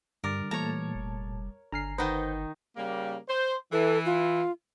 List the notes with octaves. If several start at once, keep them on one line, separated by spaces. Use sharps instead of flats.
G2 D3 G3 A#4 D6 A6
A#2 E3 A3 C#5 A5 A#5
F1
G1 D3 G#5 A#5 F6 C7
D#3 D#4 B4 C5 F#5 G6
C#3 G3 A#3
C5
E3 A4
F4